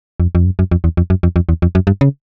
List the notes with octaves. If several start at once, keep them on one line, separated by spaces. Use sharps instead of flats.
F2
F2
F#2
F#2
F2
E2
F2
F#2
F2
F2
E2
F2
F#2
G2
C#3